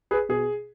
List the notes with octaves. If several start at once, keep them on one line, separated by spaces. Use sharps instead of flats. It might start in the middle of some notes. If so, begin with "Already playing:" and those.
G#4 B4
B2 G#4